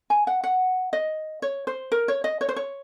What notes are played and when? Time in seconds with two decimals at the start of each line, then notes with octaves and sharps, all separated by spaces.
0.10 G#5
0.27 F#5
0.44 F#5
0.93 D#5
1.42 C#5
1.67 C5
1.92 A#4
2.08 C#5
2.24 D#5
2.41 C#5
2.49 C5
2.56 C#5